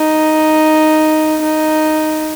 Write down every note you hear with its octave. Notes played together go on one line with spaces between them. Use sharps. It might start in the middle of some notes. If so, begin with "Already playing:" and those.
Already playing: D#4
D#4